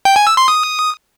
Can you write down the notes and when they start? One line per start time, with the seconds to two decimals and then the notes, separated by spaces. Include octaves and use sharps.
0.05 G5
0.16 G#5
0.27 E6
0.37 C6
0.48 D#6